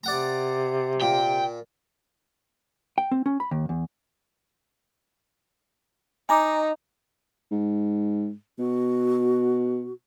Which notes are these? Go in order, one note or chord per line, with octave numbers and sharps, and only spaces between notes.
C3 D5 F#5 A#5
A#2 G5
G5
C4
C#4
B5
D#2
E2
D#4 G#5 A#5 D6
G#2
B2 F#4